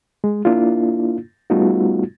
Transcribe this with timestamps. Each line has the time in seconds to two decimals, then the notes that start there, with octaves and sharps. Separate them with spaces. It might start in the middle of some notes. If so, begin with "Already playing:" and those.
0.24 G#3
0.45 A#3 D4 E4 F4
1.50 G3 A3 B3 D#4 F4 F#4